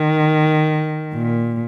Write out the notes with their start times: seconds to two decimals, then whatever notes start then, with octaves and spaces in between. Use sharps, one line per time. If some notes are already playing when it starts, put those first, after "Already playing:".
Already playing: D#3
1.14 A#2